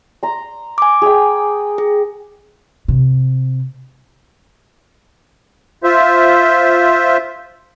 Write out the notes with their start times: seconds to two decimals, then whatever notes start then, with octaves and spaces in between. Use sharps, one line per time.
0.23 A#5 C6
0.78 G#5 D6
1.02 G#4 G5
1.78 G#4
2.88 C3
5.84 F4 C5 E5